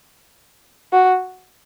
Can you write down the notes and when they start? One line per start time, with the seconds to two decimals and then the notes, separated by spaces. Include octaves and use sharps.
0.93 F#4